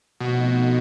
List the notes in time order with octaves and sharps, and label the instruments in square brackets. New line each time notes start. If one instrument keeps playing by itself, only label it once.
[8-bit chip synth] B2 [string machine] F3 A3 C4 D#4 F#4